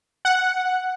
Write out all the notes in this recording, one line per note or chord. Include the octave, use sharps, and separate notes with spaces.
F#5